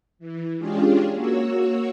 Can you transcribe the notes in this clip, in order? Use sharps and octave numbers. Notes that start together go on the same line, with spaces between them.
E3
G#3 C#4 D4 F4 G4 G#4
A#3 F#4 C#5 E6